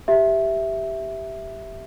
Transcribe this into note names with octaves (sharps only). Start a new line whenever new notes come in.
G4 E5